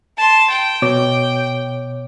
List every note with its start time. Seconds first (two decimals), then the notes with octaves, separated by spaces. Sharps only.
0.18 A5 C6
0.50 G5
0.82 B2 C#5 D6